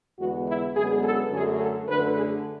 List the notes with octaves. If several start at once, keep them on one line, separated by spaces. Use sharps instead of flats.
E2 D3 G#3 B3 F#4
E4
F#2 D3 G#3 B3 G#4
A4
F#2 D3 A3 G#4
A4
F#2 D3 A3 B4
G#4